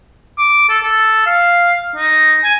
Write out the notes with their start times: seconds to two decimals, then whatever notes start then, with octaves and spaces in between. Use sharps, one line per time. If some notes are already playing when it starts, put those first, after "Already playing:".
0.38 D6
0.69 A4
0.83 A4
1.26 F5
1.96 D#4
2.44 G#5